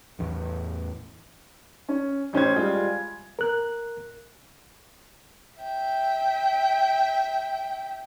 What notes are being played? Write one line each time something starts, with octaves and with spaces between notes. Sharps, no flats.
A1 E2
C#4
A1 C#4 C5 G#6
G3 G#3 F4 G#4
A#4 F#6
E5 G5